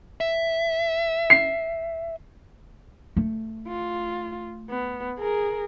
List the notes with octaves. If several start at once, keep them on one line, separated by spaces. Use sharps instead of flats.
E5
C7
A3
F4
B3
G#4 A#4